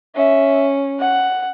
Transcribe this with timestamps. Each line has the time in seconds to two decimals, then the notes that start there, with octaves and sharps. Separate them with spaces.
0.16 C#4 E5
1.00 F#5